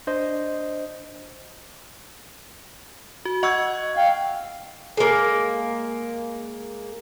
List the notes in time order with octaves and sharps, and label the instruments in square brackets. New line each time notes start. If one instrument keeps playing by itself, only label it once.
[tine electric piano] D4 C5 D#5
[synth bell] F#4
[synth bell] D#5 E6 [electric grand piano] F#5 C#6 G#6
[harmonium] F5 [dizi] G5
[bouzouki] G#3 A#3